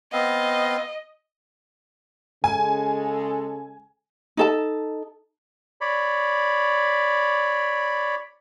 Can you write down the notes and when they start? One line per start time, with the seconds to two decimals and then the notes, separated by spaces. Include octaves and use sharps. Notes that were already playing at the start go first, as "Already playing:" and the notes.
0.13 B3 C4 D#5 F5
2.44 C#3 G#3 A4 G#5
4.37 D#4 A4 A5
5.81 C#5 D5 B5